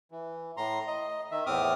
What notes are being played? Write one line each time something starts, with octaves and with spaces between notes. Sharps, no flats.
E3
A2 A#5 C6
D#5
D#3 E5
E2 A2 C4 D6 D#6 F6